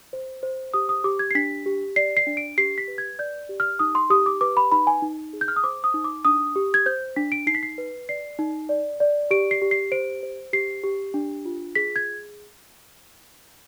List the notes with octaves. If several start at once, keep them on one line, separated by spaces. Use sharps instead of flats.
C5
C5
G4 D#6
D#6
G4 D6
G#6
C7
D4 B6
G4
D5 C7
C7
D4
D7
G4 C7
B6
B4
G#6
D5 G6
G4
F6
D#4 D#6
C6
G4 D#6
D6
B4 D6
B5
D#4 B5
G#5
D#4
G#4
G6
F6
D#6
C5 D6
D#6
D#4
D6
D4 D#6
G4
G#6
C5 G6
D4 B6
D7
D#4 C7
B6
C7
B4
D5 C7
D#4
D5
D5
G4 D7
C7
G4
C7
C5 D7
C5
G4 C7
G4
D4
F4
G#4 B6
G#6